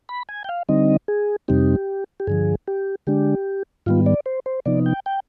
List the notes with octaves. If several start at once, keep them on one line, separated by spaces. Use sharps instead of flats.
B5
G#5
G5
F5
D3 G3 C4 D#4 D#5
G#4
F2 C3 G3 C4 D#4 G4
G4
G2 D3 F3 G#4
G4
D3 G#3 D4 G4
G#2 D#3 G3 B3 F4
D5
C5
C5
C3 F3 B3 D#4 D5
G5
G5